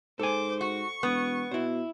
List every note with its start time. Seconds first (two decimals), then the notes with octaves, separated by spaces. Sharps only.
0.19 G#2 A4 C5 G#5 D6
0.61 F#4 C#6
1.03 E1 B3
1.51 B2 E4 C5